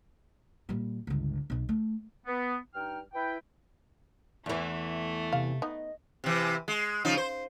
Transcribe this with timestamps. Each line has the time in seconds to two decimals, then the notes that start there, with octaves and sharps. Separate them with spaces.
0.69 A#2 G3
1.07 G1 C#2
1.50 B1 B2
1.69 A3
2.27 B3
2.75 G2 D#4 G5 F6
3.14 E4 B4 G5
4.46 E2 E3 A3
5.33 C3 F5
5.62 B3 D#4 D#5
6.24 C3 E3
6.68 G#3
7.05 C#3 F3 D#4
7.17 C5